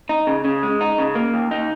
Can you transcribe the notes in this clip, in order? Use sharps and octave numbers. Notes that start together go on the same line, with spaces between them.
D#4
C#3
C#3
G#3
D#4
C#3
A#3
D#2
D#4